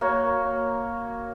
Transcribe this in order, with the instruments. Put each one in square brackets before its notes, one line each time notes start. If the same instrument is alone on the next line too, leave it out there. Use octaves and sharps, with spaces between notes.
[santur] A#3 F#4 C#5